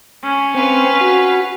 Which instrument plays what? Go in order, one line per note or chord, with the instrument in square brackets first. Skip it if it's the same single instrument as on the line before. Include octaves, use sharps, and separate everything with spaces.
[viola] C#4
[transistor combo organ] C4 [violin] B4 F5
[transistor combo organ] F#4